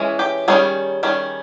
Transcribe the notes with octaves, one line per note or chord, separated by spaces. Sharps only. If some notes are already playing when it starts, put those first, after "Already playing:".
Already playing: E3 G#3 C#4
G4
D#3 G3 C#4 G#4
D#3 G3 C#4